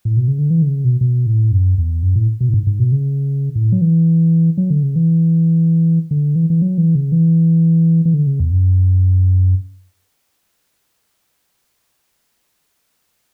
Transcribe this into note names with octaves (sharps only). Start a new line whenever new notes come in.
A2
B2
C#3
D3
E3
D3
C#3
B2
B2
A2
F#2
E2
F#2
A2
B2
A2
G#2
G#2
B2
C#3
A2
F#3
E3
F#3
D3
C#3
E3
D3
E3
E3
F#3
E3
C#3
E3
E3
D3
C#3
E2
F#2